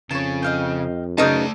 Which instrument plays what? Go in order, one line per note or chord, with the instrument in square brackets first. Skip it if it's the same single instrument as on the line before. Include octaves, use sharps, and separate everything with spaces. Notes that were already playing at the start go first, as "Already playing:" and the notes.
[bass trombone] F2 [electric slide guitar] C#3 [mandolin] C#5 A5
[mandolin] D#5 F5 G5
[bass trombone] F#2 [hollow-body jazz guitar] C#3 D#4 [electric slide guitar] A3 D5 A5 [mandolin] B3 G6